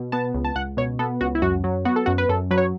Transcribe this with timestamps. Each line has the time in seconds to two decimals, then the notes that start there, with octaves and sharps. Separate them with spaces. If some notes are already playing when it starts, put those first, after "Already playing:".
Already playing: B2
0.12 B3 A5
0.34 C#2
0.45 A5
0.55 C#2 F#5
0.77 B2 C#5
0.99 B3 A4
1.21 C#2 F#4
1.35 E4
1.42 F#2 F#4
1.64 F#3
1.85 B3 F#4
1.96 A4
2.06 F#2 F#4
2.18 B4
2.29 F#2 A4
2.51 F#3 B4
2.58 C#5